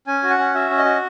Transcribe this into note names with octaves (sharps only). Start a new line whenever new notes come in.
C#4 G#5
F#4
F#5
C#4
F#4 E5
C#4
D#5
F#4